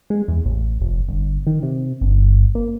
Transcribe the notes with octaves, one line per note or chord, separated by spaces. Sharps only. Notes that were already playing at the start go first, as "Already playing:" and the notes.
G#3
E2
A1
F1
G1
D#3
C3
G1
A#3